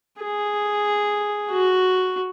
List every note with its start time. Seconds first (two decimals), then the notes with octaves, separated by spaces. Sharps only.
0.22 G#4
1.51 F#4